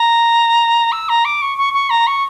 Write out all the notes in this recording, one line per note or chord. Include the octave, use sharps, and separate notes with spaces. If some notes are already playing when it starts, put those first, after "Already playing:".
Already playing: A#5
E6
A#5
D6
C#6
C#6
C#6
A#5
C#6